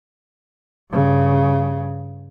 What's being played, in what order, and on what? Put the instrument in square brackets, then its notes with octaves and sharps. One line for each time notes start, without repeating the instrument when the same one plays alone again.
[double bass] G2 C#3